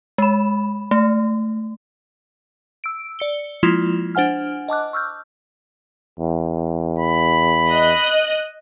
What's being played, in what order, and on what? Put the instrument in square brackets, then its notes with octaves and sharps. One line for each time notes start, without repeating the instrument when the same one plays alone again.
[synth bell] G#3 B5
A3
E6 D7
D5 C#7 G7
F3 G#3 A#3 E4 F4
D4 C5 F#5 G#5 F6
D#5 A5 D6 F#6
C#6 E6 F6 G6
[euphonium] E2
[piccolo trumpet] B5
[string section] D#5 F#6